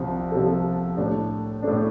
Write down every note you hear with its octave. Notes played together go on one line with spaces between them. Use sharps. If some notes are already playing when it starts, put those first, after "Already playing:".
Already playing: C2 C3 F3 C4
C2 C3 F3 C4 A4
A2 A3 D4
A2 A3 D4